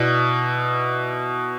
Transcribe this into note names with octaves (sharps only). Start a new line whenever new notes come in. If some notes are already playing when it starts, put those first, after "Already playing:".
Already playing: B2 B3 E4 D5